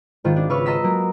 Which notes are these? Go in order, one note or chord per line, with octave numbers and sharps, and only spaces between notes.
G#1 D#3 F4
D4
C#3 B4 E5 C#6 F6
D#5 A5 A#5 C6 E6 B6
F#3 A#3